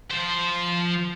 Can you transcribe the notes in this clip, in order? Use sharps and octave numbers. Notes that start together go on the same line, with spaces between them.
F3 C5